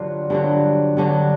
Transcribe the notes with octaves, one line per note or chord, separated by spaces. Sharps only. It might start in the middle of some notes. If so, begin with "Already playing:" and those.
Already playing: G2 D3 F#3 F4
G2 D3 F#3
G2 D3 F#3